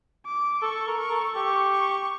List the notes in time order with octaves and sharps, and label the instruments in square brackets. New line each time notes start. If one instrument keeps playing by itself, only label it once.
[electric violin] D6
[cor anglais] A4 [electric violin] C#6
[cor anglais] A#4
[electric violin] C#6
[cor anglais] A4
[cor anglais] G4 [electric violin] C#6
[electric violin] C#6